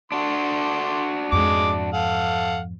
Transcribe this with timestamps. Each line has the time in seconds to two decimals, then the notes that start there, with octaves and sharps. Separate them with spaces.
0.12 D3 D4 F#4 C6
1.32 F2 G#2 G#3 D6
1.94 A4 F5 F#5